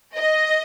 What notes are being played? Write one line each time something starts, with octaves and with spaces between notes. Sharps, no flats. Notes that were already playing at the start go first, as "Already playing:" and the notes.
D#5